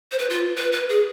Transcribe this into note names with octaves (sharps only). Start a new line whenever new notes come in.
C5
B4
F4
B4
B4
G#4